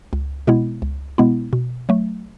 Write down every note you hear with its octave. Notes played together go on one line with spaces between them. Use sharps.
C#2
B2 G#3 B3 E4
C#2
B2 G#3 B3 E4
B2
F#3 A3